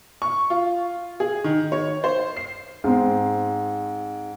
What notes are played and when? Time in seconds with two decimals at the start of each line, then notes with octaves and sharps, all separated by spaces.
0.22 C#6
0.50 F4
1.20 G#4
1.44 D#3
1.72 C#5
2.04 C5
2.37 C7
2.84 G#2 C4